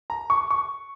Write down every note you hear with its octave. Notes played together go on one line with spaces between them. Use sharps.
A#5
C#6
C#6